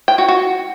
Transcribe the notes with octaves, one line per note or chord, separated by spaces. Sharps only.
G5
F#4
F#4